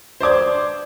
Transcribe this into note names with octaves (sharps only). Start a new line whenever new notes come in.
C5 D5 D6 G#6